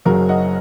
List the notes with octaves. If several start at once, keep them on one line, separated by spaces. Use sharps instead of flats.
F#1 F#2 C#3 F#3 F#4 A#4
D#5 F#5